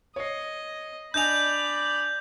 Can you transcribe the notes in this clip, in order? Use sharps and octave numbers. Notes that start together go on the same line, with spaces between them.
C#5 D#5 C7
D4 D5 D#5 G#5 B5 G6 F7